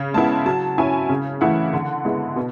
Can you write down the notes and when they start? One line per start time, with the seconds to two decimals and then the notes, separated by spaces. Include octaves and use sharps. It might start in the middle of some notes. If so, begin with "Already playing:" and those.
Already playing: C#3
0.14 G#3 B3 E4 A5
0.46 F#3 A5
0.78 C#4 E4 G#5
1.09 C#3
1.41 E3 A3 E4 F#5
1.73 D3
2.05 G#3 B3 E4
2.36 B2